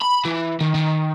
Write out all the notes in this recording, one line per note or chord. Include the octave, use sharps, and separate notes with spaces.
B5
E3
D#3
D#3